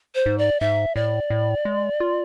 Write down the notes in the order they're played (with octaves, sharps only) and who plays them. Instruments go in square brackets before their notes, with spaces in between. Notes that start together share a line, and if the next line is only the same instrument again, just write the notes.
[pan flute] C5
[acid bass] G#2
[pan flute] D5
[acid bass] G#2 [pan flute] E5
[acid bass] A2 [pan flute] D5
[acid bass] A2
G#3
F4